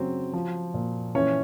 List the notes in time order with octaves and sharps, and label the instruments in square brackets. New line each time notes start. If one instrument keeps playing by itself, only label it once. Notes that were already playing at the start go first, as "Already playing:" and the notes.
Already playing: [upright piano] C#3 F#3 C4
F3
A#2
E3 C#4 C#5